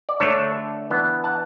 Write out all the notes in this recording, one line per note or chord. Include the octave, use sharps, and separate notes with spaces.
D5
D3 A3 D4 A4 C#5
E3 B3 D4
F#5 A5